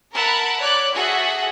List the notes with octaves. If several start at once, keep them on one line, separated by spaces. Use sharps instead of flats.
A#4 E5 F#5 A5 B5
C#5 D5 D6 F#6
F#4 G#4 A4 E5 F#5